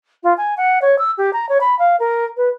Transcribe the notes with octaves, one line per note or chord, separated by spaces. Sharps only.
F4
G#5
F#5
C#5
E6
G4
A#5
C#5
B5
F5
A#4
B4